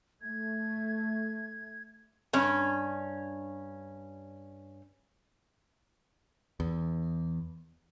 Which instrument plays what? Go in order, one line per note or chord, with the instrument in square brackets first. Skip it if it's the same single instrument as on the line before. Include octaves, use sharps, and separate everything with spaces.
[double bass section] A3 [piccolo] G#6
[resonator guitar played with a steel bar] G2 C#4
[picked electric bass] E2